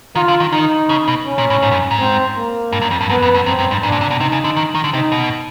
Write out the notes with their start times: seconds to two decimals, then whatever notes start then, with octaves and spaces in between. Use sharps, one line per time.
0.15 D#3 F4
0.28 D3
0.40 D#3
0.52 D#3 D#4
0.89 C#3
1.08 B2
1.26 C#4
1.38 A#2
1.50 A2
1.62 G#2
1.71 F#2
1.91 G#2
1.99 C4
2.37 A#3
2.72 G2
2.82 F#2
2.91 F2
3.01 G2
3.09 F#2 B3
3.22 F2
3.34 F2
3.46 F#2 C4
3.59 F#2
3.71 G2
3.83 G#2 D4
3.92 A#2
4.01 C3
4.11 B2
4.20 C3 D#4
4.32 C#3
4.44 D3
4.56 D#3
4.75 D#3
4.84 D3
4.93 C3 D#4
5.12 B2